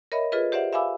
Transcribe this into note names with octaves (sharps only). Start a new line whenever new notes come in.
A#4 C#5 D#5 E5 B5
F4 G#4 A4 B4 D#5
G4 C5 D5 E5 F#5
E5 F5 G#5 B5 D6 E6